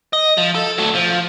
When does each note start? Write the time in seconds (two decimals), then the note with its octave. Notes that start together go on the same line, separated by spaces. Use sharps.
0.13 D#5
0.38 F3
0.55 A4
0.78 F#3 A3
0.95 F3